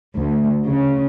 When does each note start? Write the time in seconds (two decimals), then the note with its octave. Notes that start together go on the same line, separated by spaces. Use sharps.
0.17 D2
0.69 C#3